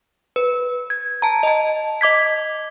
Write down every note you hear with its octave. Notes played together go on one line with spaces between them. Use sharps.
B4
G#6
A5 A#5
D#5 A5
D#5 D6 G#6 B6